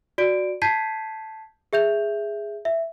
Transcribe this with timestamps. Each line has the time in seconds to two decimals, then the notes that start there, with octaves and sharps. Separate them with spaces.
0.18 F#4 D5 D7
0.62 A5 G6 G#6 B6 C7 D#7
1.73 G#4 E5 G6 F7
2.65 E5